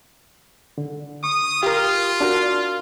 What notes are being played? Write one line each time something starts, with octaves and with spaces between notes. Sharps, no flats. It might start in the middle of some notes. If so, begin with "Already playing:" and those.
D3
C#6 D#6
F4 G4 A#4
D4 F#4 A#4